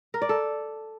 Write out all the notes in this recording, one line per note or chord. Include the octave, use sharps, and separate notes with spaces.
A#4
D5
A4